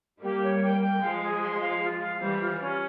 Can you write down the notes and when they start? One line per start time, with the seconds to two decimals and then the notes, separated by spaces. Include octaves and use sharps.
0.22 G3 A#3 G4
0.42 C#5
0.62 G5
0.81 G5
1.01 F3 G#3 F5
1.21 G#4
1.41 C6
1.61 F5
1.81 F4
2.00 F5
2.20 E3 G3 C5
2.40 F4
2.60 C#4